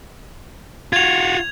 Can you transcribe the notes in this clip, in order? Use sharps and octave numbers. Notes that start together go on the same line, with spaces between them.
F4 F#4 G#6 F7